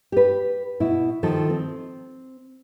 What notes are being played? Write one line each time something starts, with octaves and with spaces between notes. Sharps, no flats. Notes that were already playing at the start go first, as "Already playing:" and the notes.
G4 B4
B2 E4
D#3 F3 A4
C4